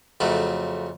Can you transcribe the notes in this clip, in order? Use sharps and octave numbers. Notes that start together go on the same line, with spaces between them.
F2 C#3 F#3 A3